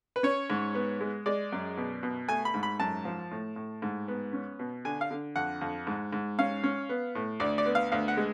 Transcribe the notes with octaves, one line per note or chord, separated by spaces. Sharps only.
B4
C#4 C#5
G#2
B3
G#3
G#3 D5
F#2
B2
B2
A3 G#5
B5
G#2
B5
F#2 A5
F3
A2
A2
G#2
B3
C#4
B2
D3 G#5
F5
D3
F2 F#5
F2
G#2
G#2
C#4 F5
C#4
B3
A2
D2 D5
D5
B3
F5
D2 F5
F#5
G#3